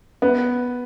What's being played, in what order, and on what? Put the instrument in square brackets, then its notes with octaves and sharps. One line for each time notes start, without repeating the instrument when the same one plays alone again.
[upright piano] B3